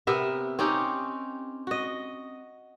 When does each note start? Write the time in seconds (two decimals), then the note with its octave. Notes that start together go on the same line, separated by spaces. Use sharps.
0.07 C3 B3 A#4 E5
0.59 C4 C#4 D#4 G4
1.67 F#4 D#5